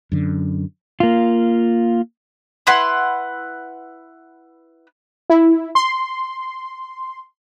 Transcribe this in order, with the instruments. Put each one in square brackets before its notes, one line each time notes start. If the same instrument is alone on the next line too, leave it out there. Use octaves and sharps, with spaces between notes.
[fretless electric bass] F#2 D3
[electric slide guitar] A#3 F4
[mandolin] E4 B4 F#5 C6
[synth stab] E4
C6